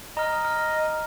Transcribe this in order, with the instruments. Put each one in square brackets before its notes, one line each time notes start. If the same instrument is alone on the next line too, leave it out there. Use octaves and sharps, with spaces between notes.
[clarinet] D#5 [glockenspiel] A#5 F6
[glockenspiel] F6